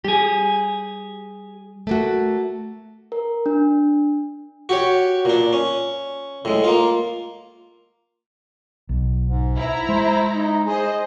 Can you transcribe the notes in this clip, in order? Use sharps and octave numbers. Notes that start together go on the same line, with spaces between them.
G3 G4 G#4
A3 A#3 F#4
A#4
D4
F#4 G4 C#5
A#2 D4
C#4
A2 G#3
A#3 F4
B1
G#2
E4 A#5
G#3 C5
D#4
G#4 C5 D#5